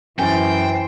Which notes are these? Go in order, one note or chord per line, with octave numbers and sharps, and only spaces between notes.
F#2 E3 C5 G5 G#5 A6